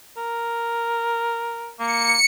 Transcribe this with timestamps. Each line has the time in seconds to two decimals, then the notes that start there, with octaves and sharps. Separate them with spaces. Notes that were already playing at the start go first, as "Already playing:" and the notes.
0.17 A#4
1.80 A#3 C#7